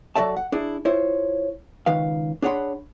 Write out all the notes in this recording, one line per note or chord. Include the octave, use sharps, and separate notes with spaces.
F#3 F#4 A4 D5 E5 A5
F#5
D4 E4 G#4
E4 F4 C5 C#5
C#2 D#3 B4 F5
D4 G#4 C#5 F#5 B5 C6